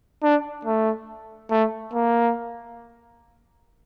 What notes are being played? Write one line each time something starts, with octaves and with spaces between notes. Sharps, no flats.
D4
A3
A3
A#3